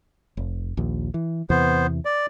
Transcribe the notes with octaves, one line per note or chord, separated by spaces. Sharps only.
F1
A#1 D#2
E3
E2 C3 E3 B3 C5
D5